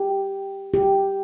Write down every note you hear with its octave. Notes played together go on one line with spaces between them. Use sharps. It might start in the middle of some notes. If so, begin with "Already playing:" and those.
Already playing: G4
G4